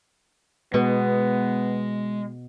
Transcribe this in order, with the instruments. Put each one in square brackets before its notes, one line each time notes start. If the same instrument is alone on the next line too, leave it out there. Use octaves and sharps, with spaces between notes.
[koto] B2 [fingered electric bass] G#3 [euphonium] B3